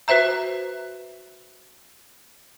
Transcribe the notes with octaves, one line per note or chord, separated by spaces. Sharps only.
F#4 B4 C5 E5 A#5